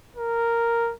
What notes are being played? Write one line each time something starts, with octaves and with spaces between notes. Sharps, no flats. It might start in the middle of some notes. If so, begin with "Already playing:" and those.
A#4